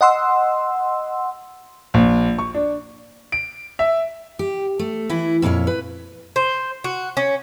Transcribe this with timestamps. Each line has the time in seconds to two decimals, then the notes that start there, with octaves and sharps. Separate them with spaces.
0.01 D#5 F#5 C6 E6
1.94 A#1
2.38 C#6
2.54 D4
3.32 D7
3.79 E5
4.39 G4
4.79 A3
5.10 E3 E4
5.42 F2 A#2 E4 C#5 F5
5.67 B4
6.36 C5
6.84 F#4
7.17 C#4